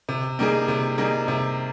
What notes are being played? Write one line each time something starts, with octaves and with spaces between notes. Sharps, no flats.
C3
G3 A#3 D#4 G#4
C3
G3 A#3 D#4 G#4
C3